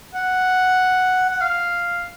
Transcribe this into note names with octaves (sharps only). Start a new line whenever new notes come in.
F#5
F#5
F5